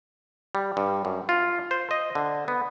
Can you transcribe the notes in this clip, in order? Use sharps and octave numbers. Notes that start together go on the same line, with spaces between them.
G3
G2
F#2
F4
C5
D#5
D3
B3